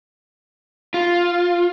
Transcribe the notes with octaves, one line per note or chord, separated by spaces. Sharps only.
F4